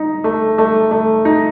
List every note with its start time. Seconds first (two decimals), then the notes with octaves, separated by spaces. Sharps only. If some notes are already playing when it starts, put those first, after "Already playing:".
Already playing: D#4
0.24 A3
0.58 A3
0.91 A3
1.25 D#4